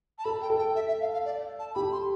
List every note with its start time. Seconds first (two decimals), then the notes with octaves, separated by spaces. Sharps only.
0.18 A5
0.25 A4 B5
0.42 G5
0.50 A4
0.59 G5
0.75 E5
0.88 E5
1.01 F5
1.13 F5
1.25 D5
1.59 A5
1.75 G4 B5
1.92 C6